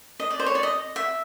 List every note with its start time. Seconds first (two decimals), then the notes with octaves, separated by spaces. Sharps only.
0.20 D#5
0.30 D5
0.39 C5
0.46 C#5
0.55 D5
0.63 D#5
0.96 E5